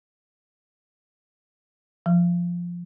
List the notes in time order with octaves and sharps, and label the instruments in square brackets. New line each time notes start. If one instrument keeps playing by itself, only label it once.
[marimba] F3